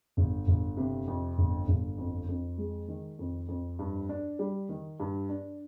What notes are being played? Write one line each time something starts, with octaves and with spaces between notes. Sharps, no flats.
G1
G1
C3
F2
G1
G1
F2
F2
G#3
D#3
F2
F2
G2
D4
G3
D#3
G2
D4